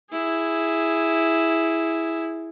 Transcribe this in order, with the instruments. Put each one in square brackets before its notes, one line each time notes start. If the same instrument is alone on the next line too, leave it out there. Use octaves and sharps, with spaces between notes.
[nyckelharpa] E4 G#4